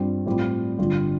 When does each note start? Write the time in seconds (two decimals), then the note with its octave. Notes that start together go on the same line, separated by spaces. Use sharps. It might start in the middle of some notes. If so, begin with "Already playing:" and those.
Already playing: G2 G3 C4 F4
0.26 A2 G3 C4 F4
0.78 G1 G2 D3 G3 F4